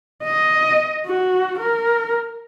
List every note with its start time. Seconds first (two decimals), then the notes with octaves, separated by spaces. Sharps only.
0.24 D#5
1.06 F#4
1.60 A#4